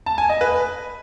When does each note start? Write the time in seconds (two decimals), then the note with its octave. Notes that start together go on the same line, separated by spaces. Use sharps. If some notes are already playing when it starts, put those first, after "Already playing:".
0.06 A5
0.18 G#5
0.29 D#5
0.41 B4